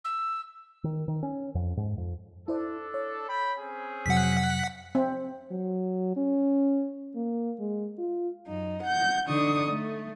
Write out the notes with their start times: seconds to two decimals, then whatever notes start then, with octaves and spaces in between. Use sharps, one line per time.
0.05 E6
0.84 D#3
1.08 D#3
1.23 C#4
1.55 F2
1.77 G#2
1.98 F2
2.48 D4 E4 A4 C5 D5
2.94 C#5
3.28 G5 B5
3.59 C4 C#4 G#4
4.06 F2 C3 F#3 F#5 B6
4.95 C4
5.51 F#3
6.17 C#4
7.16 A#3
7.59 G#3
7.98 F4
8.48 F#2 D#4
8.83 F#5 G6
9.27 D3 D4 D#4 C#6 D#6
9.71 A3